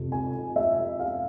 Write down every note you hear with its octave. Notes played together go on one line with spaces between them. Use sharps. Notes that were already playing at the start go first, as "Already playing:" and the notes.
Already playing: F2 C3
G#5
E5
F5